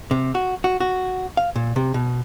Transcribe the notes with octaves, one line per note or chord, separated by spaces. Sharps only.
C3
F#4
F#4
F#4
F5
A#2
C3
B2